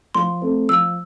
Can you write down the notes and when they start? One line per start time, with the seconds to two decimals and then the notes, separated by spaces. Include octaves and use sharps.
0.15 F3 C6
0.42 A3 C4
0.69 F3 E6